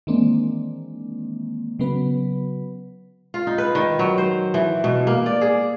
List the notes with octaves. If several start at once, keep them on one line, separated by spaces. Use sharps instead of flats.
D#3 E3 G#3 A#3 C4 D4
C#3 F#3 B3 B4
F4
D#4
B4
D#3
F#3
C5
E3
B2
A#3
D5
G#4